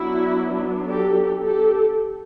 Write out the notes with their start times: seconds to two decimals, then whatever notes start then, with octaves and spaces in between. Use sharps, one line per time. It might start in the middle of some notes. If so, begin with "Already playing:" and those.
Already playing: F#3 B3 D4 E4 F#4
0.89 G4 A4
1.43 G4 A4